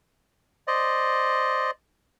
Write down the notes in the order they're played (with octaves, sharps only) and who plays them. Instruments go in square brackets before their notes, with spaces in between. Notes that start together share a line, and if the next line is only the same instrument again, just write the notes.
[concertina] C5 D5 D#5